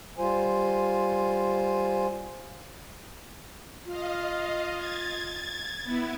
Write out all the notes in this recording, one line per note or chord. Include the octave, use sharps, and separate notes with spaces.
G3 F4 C5 G#5
F4 D#5 F5
G#6 A6
B3 E4